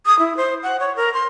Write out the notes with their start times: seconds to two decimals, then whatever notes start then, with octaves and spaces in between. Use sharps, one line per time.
0.06 D#6
0.19 E4
0.37 C5
0.63 F#5
0.80 C#5
0.96 A#4
1.14 C6